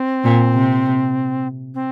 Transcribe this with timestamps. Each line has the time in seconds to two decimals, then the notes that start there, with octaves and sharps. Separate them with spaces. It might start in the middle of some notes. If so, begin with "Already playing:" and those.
Already playing: C4
0.24 A#2
0.54 C3
1.74 C4